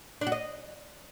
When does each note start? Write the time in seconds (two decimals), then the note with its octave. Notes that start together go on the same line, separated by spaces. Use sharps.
0.21 D4
0.27 F#4
0.32 D#5